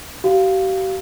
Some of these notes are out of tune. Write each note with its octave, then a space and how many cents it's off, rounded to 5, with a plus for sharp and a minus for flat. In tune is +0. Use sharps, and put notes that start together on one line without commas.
G4 -45 F5 +0